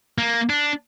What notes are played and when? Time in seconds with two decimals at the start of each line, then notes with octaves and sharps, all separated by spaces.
0.18 A#3
0.50 D4